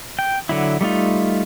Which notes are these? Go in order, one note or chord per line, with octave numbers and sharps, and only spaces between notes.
G5
D3 F#3 E4
G3 A3 D#4 F4